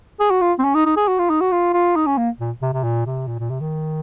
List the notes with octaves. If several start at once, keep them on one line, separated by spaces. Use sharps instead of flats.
G#4
F#4
F4
C4
C#4
D#4
D#4
G#4
F#4
F4
D#4
F#4
F4
F4
D#4
C#4
A#3
A#2
C3
C3
A#2
C3
A#2
A#2
C3
D#3